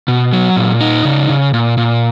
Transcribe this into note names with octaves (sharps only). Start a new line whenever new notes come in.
B2
F#3
A#2
D#4
C#3
C#3
A#2
A#2